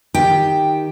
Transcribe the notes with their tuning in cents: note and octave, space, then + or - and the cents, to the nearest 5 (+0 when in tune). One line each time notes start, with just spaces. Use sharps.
D#3 +0 G4 +5 G5 +0